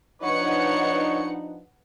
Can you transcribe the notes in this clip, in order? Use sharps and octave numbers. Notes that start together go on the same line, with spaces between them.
F3 D4 D#4 B4 C#5 F#5 C#7